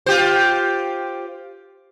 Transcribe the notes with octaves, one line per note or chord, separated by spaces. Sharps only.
F4 G4 C5